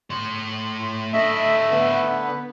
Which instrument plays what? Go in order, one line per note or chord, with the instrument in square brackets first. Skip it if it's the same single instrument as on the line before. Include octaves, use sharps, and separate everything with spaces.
[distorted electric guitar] A3 C#5 [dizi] C6
[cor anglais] A3 [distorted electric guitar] D4 E4 [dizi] A4 [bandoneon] D#5 E5
[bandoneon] D3 B3 [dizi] B4
[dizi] B4